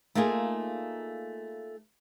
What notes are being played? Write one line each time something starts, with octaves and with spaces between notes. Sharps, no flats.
A3 A#3 D#4 F4 G#4